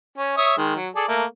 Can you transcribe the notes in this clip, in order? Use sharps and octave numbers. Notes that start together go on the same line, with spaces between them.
C#4
C#5 E5 D#6
D#3 G#3
F#3
G#4 A4 D5
A3 A#3